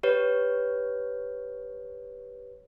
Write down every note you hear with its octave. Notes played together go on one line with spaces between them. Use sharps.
G4 B4 C#5